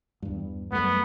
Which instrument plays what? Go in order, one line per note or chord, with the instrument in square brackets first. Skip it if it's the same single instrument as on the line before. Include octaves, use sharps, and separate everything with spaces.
[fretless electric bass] E2 G2
[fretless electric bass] F#2 G3 A3 [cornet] B3